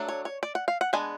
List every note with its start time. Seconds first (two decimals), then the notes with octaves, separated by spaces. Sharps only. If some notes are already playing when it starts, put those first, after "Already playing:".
Already playing: F#3 A3 D4
0.09 C#5
0.25 C#5
0.43 D5
0.55 F#5
0.68 F5
0.81 F#5
0.93 G#3 B3 D4 G#5